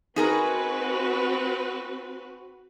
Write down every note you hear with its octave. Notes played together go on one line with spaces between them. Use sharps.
C4 D#4 F#4 G#4 A#4 B4